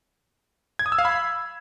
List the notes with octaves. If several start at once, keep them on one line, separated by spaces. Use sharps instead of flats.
G#6
D#6
E6
F5
B5